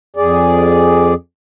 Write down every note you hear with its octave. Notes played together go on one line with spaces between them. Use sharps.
F2 G#4 D5